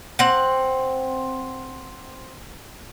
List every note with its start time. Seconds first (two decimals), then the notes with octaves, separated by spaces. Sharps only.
0.19 C4 F#5